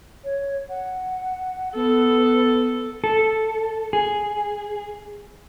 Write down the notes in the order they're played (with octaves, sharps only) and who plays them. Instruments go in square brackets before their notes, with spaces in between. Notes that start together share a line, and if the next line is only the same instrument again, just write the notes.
[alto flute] C#5
F#5
[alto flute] B3 [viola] A4
[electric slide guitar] A4
G#4